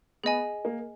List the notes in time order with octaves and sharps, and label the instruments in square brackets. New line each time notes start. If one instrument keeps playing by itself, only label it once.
[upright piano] B3 [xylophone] G#4 D#5 G#5
[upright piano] A#3